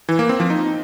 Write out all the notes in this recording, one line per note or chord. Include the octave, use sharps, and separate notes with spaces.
E3
A#3
C4
F3
D#4